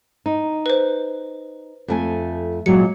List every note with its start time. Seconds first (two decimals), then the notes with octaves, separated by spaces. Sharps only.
0.26 D#4
0.66 B4 C5
1.88 F2 A3 G#5
2.66 A#2 F#3 G#3 C#7